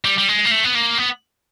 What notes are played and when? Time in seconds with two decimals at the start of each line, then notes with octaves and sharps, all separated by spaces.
0.05 G3
0.18 G3
0.28 G#3
0.45 A#3
0.52 A3
0.65 B3
0.75 A#3
0.98 B3